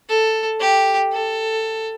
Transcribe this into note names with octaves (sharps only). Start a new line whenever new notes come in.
A4
G4
A4